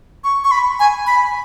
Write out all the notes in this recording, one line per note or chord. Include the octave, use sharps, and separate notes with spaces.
C#6
C#6
B5
G#5
B5